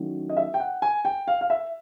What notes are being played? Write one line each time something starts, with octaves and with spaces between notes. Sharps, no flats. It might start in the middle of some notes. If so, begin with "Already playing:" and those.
Already playing: D#3 F#3 A3 C#4 E4
D#5
E5
G5
F#5
G#5
G5
F5
F5
E5